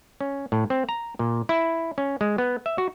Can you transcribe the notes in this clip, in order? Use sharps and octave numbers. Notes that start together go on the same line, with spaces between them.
C#4
A2
C4
A#5
A#2
E4
C#4
G#3
B3
E5
F#4